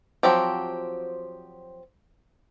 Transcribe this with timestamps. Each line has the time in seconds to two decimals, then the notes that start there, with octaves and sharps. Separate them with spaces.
0.23 F3 F#3 C4 F#4 G4